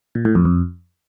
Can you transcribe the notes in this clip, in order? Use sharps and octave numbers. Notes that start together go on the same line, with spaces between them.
A#2
A2
F2
F2